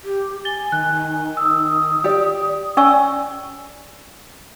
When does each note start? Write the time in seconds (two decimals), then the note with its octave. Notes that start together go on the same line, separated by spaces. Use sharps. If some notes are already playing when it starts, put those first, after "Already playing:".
0.04 G4
0.45 G#5 A6 G7
0.72 D#3 F#6
1.37 D#6 E6
2.04 G4 D5
2.77 C#4 C#5 D5 G#5 C#6 E6